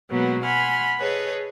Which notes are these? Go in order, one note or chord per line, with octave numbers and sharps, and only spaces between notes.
B2 F#3 G#3 A#3 B3 F#4
F#5 G#5 B5 C6 F6
G#4 A4 B4 C#5 D#5